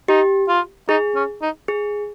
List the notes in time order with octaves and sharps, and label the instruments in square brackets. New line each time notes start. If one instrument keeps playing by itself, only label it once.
[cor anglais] D#4 [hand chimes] G4
[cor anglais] F4
[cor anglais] D#4 [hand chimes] G#4
[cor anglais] C#4
D#4
[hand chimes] G#4